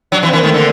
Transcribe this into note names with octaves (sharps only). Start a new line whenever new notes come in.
F#3 D4
E3 C4
E3 A#3
D#3 A3
D3 A#3